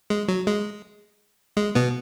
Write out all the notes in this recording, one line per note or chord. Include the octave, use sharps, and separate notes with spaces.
G#3
F#3
G#3
G#3
B2 B3